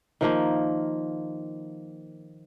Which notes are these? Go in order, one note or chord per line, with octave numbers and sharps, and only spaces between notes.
D#3 F3 A#3